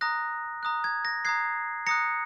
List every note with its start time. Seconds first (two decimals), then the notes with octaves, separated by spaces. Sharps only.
0.01 A#5 D#6 F#6 A#6
0.63 A#5 D#6 F#6
0.84 G#6
1.05 A#6
1.25 A#5 D#6 F#6 G#6 C7
1.86 A#5 D#6 F#6 A#6 C#7